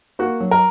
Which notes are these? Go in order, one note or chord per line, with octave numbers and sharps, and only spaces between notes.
A#3 F#4
F#3
A#4